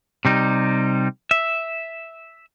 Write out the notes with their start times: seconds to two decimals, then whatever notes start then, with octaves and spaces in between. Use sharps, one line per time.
0.25 C3 G3 D#4
1.31 E5